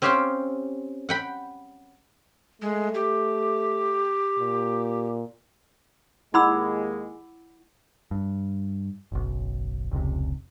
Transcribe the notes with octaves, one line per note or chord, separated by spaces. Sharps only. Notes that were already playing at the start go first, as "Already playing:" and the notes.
C4 C#4 G4 C5 F5 G5
F#5 G5 B5
G#3 A3
G4
A#2
D#2 G#3 E4 F#5 B5 D6 E6 G#6
G2
F#1 B1
F1 C#2 C3